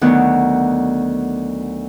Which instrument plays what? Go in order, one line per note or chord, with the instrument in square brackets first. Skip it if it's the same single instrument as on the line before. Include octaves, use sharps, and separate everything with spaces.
[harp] D2 D#3 F#3 B3 F#5